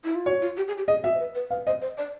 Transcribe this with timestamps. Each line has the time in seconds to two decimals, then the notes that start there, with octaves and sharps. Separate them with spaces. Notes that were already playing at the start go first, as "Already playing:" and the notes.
0.04 E4
0.15 F4
0.26 F#4 C#5
0.42 F4
0.57 G4
0.68 G#4
0.78 G4
0.88 G#4 D#5
1.04 F#4 E5
1.15 C5
1.19 B4
1.35 B4
1.50 B4 F5
1.67 C5 D#5
1.81 C5
1.98 D5